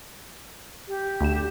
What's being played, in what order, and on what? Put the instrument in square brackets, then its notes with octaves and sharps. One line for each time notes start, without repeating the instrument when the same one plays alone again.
[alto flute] G4
[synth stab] D2 E7